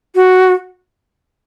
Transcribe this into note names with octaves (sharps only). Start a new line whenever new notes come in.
F#4